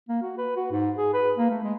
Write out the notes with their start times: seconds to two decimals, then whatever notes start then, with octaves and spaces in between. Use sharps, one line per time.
0.09 A#3
0.22 F#4
0.38 B4
0.56 F#4
0.72 G#2
0.98 G#4
1.14 B4
1.37 A#3
1.51 A3
1.64 G#3